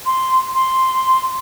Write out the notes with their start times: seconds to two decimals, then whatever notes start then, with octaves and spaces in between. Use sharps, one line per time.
0.06 C6
0.55 C6